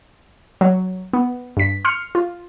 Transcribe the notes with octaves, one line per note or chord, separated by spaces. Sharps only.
F#3
B3
G2 B6
C6 F6 C#7
F4